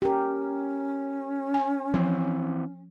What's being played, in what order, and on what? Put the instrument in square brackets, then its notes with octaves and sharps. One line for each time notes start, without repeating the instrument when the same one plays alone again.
[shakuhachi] C#4 [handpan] G4 A#4
[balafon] G#5
[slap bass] E3 C4 [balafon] F3